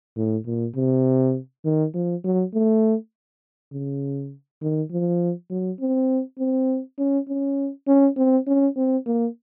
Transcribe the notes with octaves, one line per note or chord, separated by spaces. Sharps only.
A2
A#2
C3
D#3
F3
F#3
A3
C#3
D#3
F3
F#3
C4
C4
C#4
C#4
C#4
C4
C#4
C4
A#3